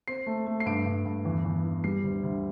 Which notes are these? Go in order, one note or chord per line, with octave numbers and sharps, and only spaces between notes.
C4 C7
A3
A3
C7
G2 D7
G2
G2
E2
E2
E3
G3 C7
D2
D2